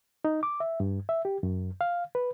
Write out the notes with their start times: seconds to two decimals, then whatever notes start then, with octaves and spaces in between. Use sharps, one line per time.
0.25 D#4
0.43 D6
0.60 E5
0.80 G2
1.09 E5
1.25 G4
1.43 F#2
1.81 F5
2.15 B4